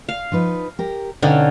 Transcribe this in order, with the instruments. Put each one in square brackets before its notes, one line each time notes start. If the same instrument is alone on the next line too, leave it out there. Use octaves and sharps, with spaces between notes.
[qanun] F5
[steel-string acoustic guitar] F3 D#4 B4
G4 A#4
[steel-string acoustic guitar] B2 F5 G5 [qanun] D3 C#4 D#4